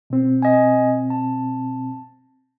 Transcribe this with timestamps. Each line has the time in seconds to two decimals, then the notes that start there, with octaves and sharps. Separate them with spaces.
0.10 B2 C4
0.42 D#5 G#5
1.10 A5